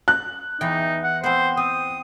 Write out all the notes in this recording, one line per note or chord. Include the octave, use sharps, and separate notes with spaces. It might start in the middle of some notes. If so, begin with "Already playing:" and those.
F#6
E2 E3 D#4 G5
F#5
B3 C4 C5
C4 D#6